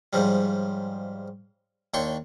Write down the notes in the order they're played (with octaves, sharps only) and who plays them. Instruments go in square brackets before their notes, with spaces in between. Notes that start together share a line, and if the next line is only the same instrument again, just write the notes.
[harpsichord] G#2 C#3 F3 G3
D#2 D4 C#5 G5 C6 C#6